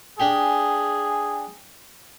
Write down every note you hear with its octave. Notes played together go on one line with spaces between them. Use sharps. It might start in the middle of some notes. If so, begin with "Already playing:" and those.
D4 G4 G#4